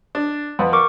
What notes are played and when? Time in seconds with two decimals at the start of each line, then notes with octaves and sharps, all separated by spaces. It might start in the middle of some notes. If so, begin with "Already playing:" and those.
0.15 D4
0.59 F2 B4 F#5
0.73 A#4 C#6 D6